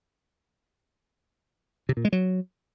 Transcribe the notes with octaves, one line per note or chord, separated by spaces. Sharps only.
C3
A#2
G#3
F#3